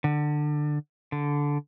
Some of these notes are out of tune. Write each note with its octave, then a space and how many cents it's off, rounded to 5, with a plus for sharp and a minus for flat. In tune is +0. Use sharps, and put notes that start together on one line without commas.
D3 +20
D3 -15